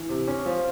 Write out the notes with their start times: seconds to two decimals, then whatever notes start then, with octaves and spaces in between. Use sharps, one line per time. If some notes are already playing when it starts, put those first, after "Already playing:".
Already playing: E3
0.09 C3
0.28 C#4
0.46 F3